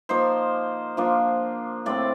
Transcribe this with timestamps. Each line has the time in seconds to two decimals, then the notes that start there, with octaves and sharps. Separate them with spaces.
0.09 F3 A#3 D#4 C5
0.97 F3 A#3 D4 F4
1.86 A2 A3 C4 D5